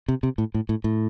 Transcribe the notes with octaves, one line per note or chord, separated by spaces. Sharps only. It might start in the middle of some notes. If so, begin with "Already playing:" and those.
C3
C3
A2
A2
A2
A2